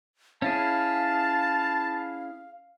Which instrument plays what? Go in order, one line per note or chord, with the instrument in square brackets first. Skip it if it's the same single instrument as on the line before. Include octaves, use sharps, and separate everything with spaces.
[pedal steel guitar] C#4 E4 G#4 [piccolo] F5 [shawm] A5